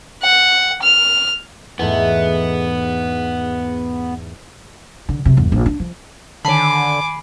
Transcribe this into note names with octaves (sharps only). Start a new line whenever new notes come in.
F#5
F6
E2 G#2 A3 B3
D3
F#2 C3
G1 E2
A#1
D4
F3
D3 D#3 G#5 A5 B5 D6 C7